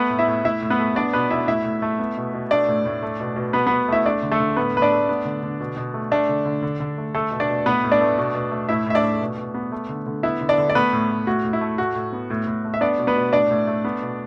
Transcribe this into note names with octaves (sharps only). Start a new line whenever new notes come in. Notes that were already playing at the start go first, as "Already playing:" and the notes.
Already playing: A3 B3 B4
A2
E4 E5
A2
A2 E4 E5
A2
B3 B4
A3
B3 D4 D5
B2 B3 B4
B2 E4 E5
A2 E4 E5
A2
A3
B3
B2
B2
A3 D4 D5
A2
A2
A3
B2
B2
B2 B3 B4
B2 B3 B4
A3 E4 E5
A3 D4 D5
D3
A3 A4
D3
A2 B3 B4
A2 B4
D4 D5
A3
B3
D3
D3
B2
B2
A3
A3 D4 D5
D3
D3
D3
D3
A3
A3 A4
B2
D4 D5
B2
A2 B3 B4
A2
D4 D5
A3
B2
B2
A3
A2 E4 E5
A2 E5
D4 D5
A3
B2
B2
B3
A3
D3
D3
B3 E4 E5
D3
D4 D5
D3
D5
A3 B3 B4
A2
A2
A2 F#4
A2
E4
A3
A2 F#4
A2
B3
A2
A2
A3
E5
B3 D4 D5
B2
B3 B4
B2
A2 D4 D5
A2
A3
B3
B2